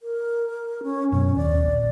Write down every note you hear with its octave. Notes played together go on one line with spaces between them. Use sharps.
A#4
C#4
F#2 B2 C#4
D#2 D5
A#1